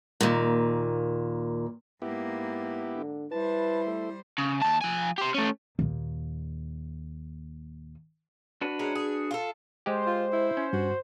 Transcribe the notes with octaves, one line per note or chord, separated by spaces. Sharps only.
D#2 A#2
G#2 A#3 B3 E4 G4
D3
G3 E4 B4 C5 A5
A3
C#3
D#2 A5
F3 G#5
G4 C5
A3 C#4
D#2 A#2
D4 F#4 B4
G#3 C#4 A#4
G#4
F4 G4 A4
G#3 G4 C5
F4
E4
C#4
G2 F#4